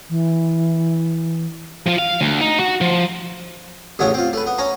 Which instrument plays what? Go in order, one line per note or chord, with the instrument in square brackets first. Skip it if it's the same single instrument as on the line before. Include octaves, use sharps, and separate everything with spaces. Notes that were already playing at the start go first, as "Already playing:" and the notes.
[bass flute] E3
[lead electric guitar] F3 F4
F5
D2
D#4
F#4
F3
[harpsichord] A1 E2 C#3 F#4 C#5
C4 F4
A3 B4
B3
C#4 C#5 A#5